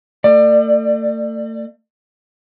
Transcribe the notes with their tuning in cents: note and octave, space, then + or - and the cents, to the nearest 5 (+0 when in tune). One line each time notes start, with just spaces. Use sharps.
A3 +40 D5 +30